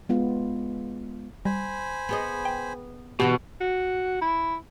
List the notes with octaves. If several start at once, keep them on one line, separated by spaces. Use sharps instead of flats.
G#3 B3 F4
G3 C5 G#5 B5
B3 G#4 D#5
G5
B2 D3 E3 F#4 G4
F#4
E4